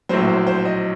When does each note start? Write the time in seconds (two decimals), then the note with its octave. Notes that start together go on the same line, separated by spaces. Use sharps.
0.09 A#1 A2 F#3 C5
0.28 C5
0.47 C5
0.65 D#5